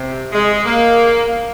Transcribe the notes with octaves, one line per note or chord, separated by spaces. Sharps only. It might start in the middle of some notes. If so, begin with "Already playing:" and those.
Already playing: C3
G#3
A#3